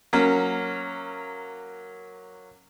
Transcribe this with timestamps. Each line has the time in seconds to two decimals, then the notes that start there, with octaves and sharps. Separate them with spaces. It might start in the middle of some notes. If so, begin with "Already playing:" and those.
0.13 F#3 A#3 C#4